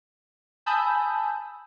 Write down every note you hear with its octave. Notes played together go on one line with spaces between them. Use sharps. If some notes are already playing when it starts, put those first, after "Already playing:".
G#5 A5 B5 D#6 E6 G6